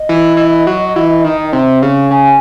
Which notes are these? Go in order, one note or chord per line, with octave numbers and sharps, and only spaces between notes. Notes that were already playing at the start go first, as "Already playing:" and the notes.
Already playing: D#5
E3
E3
F#3
E3
D#3
C3
C#3
C#3 G#5